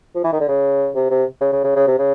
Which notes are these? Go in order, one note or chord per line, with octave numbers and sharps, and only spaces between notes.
F3
E3
D#3
D3
C#3
C3
C3
C#3
C#3
C#3
C#3
C3
C#3